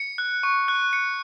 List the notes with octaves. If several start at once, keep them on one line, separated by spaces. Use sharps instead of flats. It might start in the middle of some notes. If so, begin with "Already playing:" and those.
Already playing: C#7
F#6
C#6
F#6
C#7